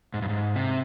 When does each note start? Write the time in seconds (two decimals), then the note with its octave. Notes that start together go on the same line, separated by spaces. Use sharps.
0.14 G#2
0.22 G2
0.29 G#2
0.56 C3